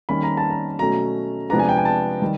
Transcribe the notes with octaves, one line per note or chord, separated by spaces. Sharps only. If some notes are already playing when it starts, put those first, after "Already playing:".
D#3 G3 A#3 C#4 B5
A#5
A5
A#5
B2 F#3 A3 C#4 A#5
C3 F3 G#3 B3 D4 A#5
G#5
G5
G#5
A5
D#3 G3